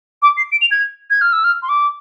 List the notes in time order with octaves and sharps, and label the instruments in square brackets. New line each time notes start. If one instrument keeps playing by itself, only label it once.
[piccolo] D6
C7
D7
F7
G#6
G#6
F6
E6
F6
C6
D6